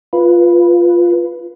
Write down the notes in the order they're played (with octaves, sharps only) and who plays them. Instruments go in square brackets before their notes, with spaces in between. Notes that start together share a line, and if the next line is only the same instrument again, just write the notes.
[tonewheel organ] F4 B4